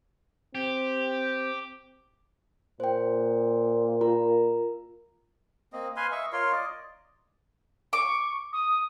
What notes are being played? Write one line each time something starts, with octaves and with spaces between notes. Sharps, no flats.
C4 G4
A#2 C5 G5
F4 A#4 A#5
A#3 C4 D#5
B4 F5 G#5 C6
D#5 E5 C#6
F4 A#4 C#5 C6
D5 D#5
C#6 D6
D#6